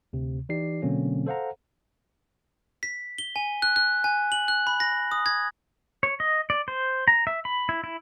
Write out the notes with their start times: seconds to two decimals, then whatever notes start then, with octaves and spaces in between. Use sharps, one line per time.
0.13 D2 C3
0.49 E3 D#4 G4 D5 C7
0.82 B2 D3 F#3 A#3 C4 C#4
1.26 A4 C5 F5 F#5 A#5
2.83 B6
3.18 G7
3.36 G#5
3.62 F#6
3.76 F#6
4.04 G#5
4.32 F#7
4.48 F#6
4.67 B5
4.80 A#6
5.11 D#6
5.26 G#6
6.03 C#5
6.20 D#5
6.50 D5
6.68 C5
7.08 A#5
7.27 E5
7.45 B5
7.69 E4
7.84 E4